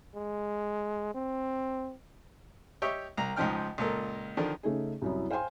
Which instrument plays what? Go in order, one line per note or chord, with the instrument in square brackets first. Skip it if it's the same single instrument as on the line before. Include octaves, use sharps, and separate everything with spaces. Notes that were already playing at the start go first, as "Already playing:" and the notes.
[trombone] G#3
C4
[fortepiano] G4 C#5 D#5 E5 G5
C2 A#5
C#2 G#2 F3 D#4 G5 F6
C#2 A#2 A4 A#4
D3 D#3 F3 D4
[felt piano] C#3 A3 D#4 G#4
C2 F#2 E4
C5 F5 G5 G#5 C6